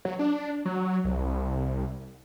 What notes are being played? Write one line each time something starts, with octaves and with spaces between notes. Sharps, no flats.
F#3
D4
F#3
C2